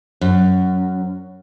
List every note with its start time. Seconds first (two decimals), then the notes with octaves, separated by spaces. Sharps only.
0.21 F#2